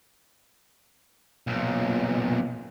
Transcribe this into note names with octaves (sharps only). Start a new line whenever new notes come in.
B1 A#2